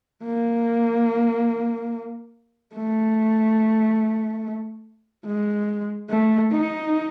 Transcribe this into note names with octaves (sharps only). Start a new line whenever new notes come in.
A#3
A3
G#3
A3
D#4